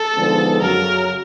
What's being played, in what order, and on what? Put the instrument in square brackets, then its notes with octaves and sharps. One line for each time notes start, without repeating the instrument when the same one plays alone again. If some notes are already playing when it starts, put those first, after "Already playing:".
Already playing: [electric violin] A4
[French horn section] D3 F3 G#3 B3 D#4
[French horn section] F#2 C#3 F#3 [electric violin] A#4